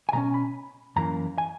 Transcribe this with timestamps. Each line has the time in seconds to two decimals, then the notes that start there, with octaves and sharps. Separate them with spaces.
0.09 G#5
0.13 B2 G#3 C#4 A#5
0.34 B5
0.96 F#2 E3 A#3 C#4 A#5
1.38 G#5